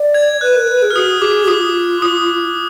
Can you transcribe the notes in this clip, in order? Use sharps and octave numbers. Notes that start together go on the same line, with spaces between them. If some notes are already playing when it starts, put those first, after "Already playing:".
Already playing: D5
G#6
B4 F#6
A#4
B4
G#4
F6
F#4 D#6
G#4 D6
F4 D#6
D#6